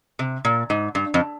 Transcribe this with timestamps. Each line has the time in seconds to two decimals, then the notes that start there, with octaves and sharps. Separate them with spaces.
0.19 C3
0.45 A#2
0.70 G#2
0.95 G2
1.14 F2